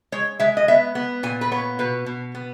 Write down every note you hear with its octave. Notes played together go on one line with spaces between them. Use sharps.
G#3 C#5
G#3 E5
D#5
B3 E5
B3
A#2 G#5
B4
B3 C#5
B2 B4
B2
B3